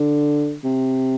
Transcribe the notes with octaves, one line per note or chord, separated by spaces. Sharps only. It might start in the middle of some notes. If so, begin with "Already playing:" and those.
Already playing: D3
C3